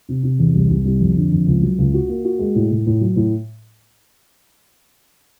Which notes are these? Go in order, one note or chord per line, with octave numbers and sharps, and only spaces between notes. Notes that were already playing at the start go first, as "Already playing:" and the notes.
C3
C3
E2
C2
C2
C2
F2
D3
F2
C#2
F#3
C#2
F#4
A#3
F#4
G#3
A2
A2
A2
F#3
A2